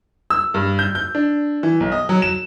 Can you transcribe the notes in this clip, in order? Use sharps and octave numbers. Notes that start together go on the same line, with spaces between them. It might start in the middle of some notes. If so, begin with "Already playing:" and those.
E6
G2
G6
G6
D4
E3
B1
D#5
F#3
E7